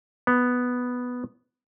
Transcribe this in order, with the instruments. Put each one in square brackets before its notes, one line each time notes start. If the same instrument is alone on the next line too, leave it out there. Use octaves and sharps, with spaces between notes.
[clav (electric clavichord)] B3